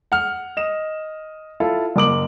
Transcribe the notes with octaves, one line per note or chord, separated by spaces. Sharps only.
F#5 F6
D#5 E7
E4 F4 A4
F#1 A#3 D6 F#7